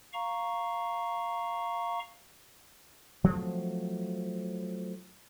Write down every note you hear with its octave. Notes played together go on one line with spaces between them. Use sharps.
F5 A#5 C#6
F3 F#3 A3 C4